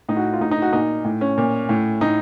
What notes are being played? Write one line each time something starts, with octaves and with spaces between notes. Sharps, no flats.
A2 D#4
F#4
F4
A2 D#4
D#4
F#4
A#2 D#4
A2
C#4
A#2
A2
A2 D#4